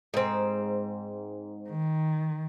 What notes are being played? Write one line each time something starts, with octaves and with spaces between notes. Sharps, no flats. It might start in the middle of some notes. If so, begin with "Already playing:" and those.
G#2 C4
D#3